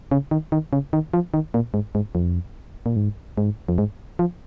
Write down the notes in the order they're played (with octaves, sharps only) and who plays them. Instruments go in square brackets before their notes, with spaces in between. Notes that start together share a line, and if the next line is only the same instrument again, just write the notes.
[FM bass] C#3
D#3
D#3
C#3
D#3
F3
D#3
A#2
G#2
G#2
F2
A#2
G#2
G#2
F2
G#2
F3